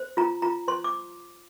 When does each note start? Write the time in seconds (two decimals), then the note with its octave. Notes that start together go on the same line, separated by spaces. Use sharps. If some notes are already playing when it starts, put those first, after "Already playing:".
Already playing: C5
0.17 F4 A#5
0.42 F4 A#5
0.68 C5 C6
0.84 D6